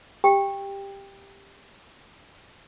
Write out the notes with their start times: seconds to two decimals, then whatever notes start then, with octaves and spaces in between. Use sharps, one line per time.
0.24 G4 G5